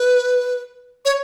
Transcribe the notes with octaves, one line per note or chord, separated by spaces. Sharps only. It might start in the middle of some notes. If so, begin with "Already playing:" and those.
Already playing: B4
C#5